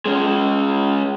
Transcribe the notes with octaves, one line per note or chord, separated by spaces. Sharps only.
G#3 C#4